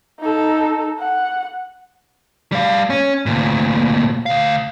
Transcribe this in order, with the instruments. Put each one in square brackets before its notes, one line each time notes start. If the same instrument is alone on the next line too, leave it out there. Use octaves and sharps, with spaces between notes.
[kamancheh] D#4 A4
F#5
[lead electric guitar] G3 F5
C#4
D2 A#2
D2 F5